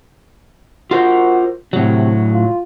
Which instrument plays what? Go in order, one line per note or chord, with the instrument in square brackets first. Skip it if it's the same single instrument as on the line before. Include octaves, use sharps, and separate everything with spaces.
[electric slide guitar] F4 A#4 C5 [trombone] F#4
[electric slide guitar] A2 F#3 [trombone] C3
[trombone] F4